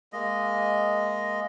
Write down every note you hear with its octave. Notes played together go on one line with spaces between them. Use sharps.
G#3 A#3 D#5